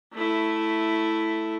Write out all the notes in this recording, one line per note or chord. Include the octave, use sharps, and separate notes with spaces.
A3 E4